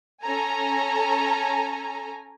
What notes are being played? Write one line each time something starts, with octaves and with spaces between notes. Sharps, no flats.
C#4 A4 G#5 A#5